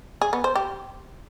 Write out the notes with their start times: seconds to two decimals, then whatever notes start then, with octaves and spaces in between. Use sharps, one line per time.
0.22 G#4
0.33 B3
0.44 C5
0.56 G4